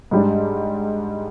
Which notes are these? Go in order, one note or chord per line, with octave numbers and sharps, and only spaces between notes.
G#2 G3 D4